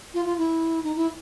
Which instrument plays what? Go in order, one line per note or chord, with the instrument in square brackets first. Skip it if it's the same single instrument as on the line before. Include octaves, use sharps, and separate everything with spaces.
[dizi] F4
F4
E4
D#4
E4